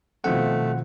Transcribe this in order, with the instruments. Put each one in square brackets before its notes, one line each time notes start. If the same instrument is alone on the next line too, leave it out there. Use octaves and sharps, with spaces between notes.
[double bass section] B2 [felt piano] D#3 F3 C4 [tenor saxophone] A3 [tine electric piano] F#5